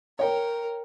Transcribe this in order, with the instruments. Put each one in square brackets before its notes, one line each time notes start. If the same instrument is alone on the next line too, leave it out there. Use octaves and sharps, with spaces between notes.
[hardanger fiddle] A#4 [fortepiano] C#5 G5